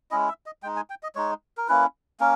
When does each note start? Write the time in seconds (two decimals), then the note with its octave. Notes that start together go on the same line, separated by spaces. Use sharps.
0.11 G#3 C#4 E4 D#5
0.28 E5
0.46 D#5
0.63 G#3 D#4 G5
0.76 G#5
0.90 G5
1.03 D#5
1.15 G#3 D#4 C#5
1.57 A#4
1.68 A#3 C#4 E4 B4
2.20 A#3 C#4 A#4